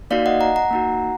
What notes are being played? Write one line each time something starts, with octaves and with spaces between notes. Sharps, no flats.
A#3 D#4 F#4 D5 F5
D#5 F#5
F#5 A#5
F#5 A#5
A#3 D#4 F#4